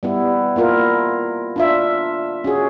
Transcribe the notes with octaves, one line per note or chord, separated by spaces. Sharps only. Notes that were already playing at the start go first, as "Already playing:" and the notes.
G3 B3 E4
A#3 E4 F4 A#4
D4 F4 E5
C#4 F#4 G#4